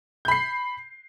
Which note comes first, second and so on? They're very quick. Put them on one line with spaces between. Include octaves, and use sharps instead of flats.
G6 B5 C7